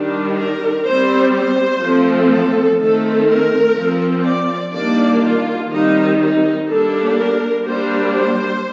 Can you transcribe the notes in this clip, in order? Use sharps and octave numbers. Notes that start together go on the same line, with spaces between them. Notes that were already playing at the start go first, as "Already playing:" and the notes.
Already playing: D#3 G3 D4
A#4
G3 C4 C5
C5
F3 A3 C4
A4
D#3 A3 C4 A4
A#4
F3 C4
D5
D#3 G3 A#3 D4 D5
F4
D#3 G3 C4 D#4
D#4
G3 A#3 D4 A4
A#4
G3 A#3 D4 C5
C5